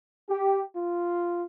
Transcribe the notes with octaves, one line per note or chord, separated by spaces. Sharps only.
G4
F4